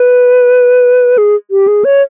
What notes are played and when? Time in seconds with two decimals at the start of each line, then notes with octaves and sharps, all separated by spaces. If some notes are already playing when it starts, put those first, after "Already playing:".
Already playing: B4
1.18 G#4
1.51 G4
1.68 G#4
1.85 C#5